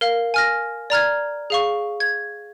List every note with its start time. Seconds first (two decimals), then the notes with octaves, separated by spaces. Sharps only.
0.01 A#4 F5
0.34 G#5 F6 A#6
0.90 D5 A#5 F6 G#6
1.50 G#4 F5 C#6
2.00 G#6